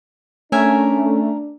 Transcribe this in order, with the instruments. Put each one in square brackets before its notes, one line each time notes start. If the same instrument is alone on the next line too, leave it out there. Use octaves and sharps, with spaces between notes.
[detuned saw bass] A3 [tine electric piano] C#4 [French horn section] D4 [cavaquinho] A#4 E5 G#5